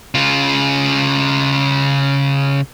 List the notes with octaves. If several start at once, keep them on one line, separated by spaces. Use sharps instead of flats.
C#3 F4